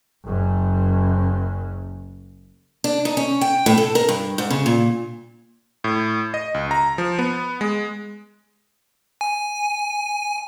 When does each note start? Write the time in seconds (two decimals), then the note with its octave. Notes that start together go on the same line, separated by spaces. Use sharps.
0.25 F#1 F#2
2.84 D4
3.05 D#4
3.17 C#4
3.41 G5
3.66 A2
3.78 A4
3.95 A#4
4.08 G2
4.38 G#2
4.50 C#3
4.66 A#2
5.84 A2
6.34 D#5
6.54 C#2
6.71 A#5
6.98 F3
7.19 B3
7.61 G#3
9.21 G#5